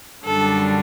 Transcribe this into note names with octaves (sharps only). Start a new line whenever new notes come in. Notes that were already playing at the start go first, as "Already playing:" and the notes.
F#2 D3 G3 D4 A4